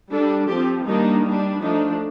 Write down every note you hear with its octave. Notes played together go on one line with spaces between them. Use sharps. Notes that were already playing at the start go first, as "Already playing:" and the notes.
G3 D4 A4
F3 C4 G4
D#3 G3 A#3 D4 D#4
G3 D4
F3 A3 D4 D#4